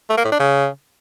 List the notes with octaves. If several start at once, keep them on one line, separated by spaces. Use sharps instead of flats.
A3
A#3
A2
D4
C#3